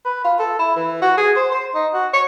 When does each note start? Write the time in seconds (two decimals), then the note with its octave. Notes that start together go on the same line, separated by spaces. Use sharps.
0.05 B4
0.24 F4
0.39 A4
0.59 E4
0.76 E3
1.02 F#4
1.17 G#4
1.36 C5
1.51 C5
1.74 D#4
1.93 F#4
2.13 C#5